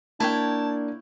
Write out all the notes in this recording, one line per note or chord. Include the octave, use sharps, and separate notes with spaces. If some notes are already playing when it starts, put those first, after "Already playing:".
A#3 D4 E4 C#5 G5 A5